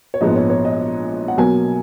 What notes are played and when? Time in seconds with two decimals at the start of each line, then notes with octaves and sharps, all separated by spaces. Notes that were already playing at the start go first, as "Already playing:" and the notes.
0.14 C#5
0.21 A#1 G#2 F3 G#3 B3 D#5
0.36 C#5
0.50 C#5
0.65 D#5
1.28 F#5
1.37 B1 B2 F#3 A#3 G#5